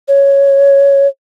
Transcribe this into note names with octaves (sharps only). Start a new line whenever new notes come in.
C#5